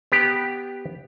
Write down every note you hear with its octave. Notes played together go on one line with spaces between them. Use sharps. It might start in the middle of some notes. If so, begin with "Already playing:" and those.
B3 G4